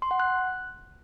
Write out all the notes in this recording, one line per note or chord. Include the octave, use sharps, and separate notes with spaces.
C6
F#5
F#6